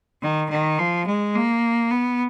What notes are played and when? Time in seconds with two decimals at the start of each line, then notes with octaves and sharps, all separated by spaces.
0.22 D#3
0.50 D#3
0.78 F3
1.07 G#3
1.35 A#3
1.91 B3